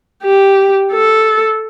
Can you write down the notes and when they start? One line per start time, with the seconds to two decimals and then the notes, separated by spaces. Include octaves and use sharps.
0.23 G4
0.92 A4